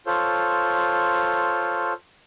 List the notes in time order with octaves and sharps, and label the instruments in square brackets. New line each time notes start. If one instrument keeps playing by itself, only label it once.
[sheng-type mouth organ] F4 A4 C5 C#5